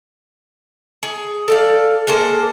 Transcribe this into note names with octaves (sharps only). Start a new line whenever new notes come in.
G#4
A4 D5 F5
G#3 A#3 A4 C5